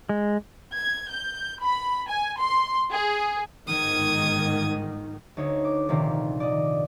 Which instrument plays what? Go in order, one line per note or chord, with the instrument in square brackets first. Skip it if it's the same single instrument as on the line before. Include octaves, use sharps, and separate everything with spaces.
[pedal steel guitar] G#3
[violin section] G#6
G6
B5
G#5
C6
G#4
[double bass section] G1 G#2 D#3 [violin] D#6 G#6
[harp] D2 D#4 C#5
D6
A#1 C3 D#3 A#3 C4
D5 D#5